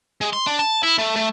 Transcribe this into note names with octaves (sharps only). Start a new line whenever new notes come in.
G#3
C6
D4
A5
E4
A3
A3